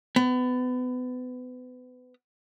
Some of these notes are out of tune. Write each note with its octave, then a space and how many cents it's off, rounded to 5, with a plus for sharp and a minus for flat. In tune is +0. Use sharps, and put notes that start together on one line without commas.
B3 +30